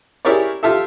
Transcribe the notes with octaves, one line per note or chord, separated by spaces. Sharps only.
E4 G4 G#4 A#4 C#5 D5
F4 G4 A4 E5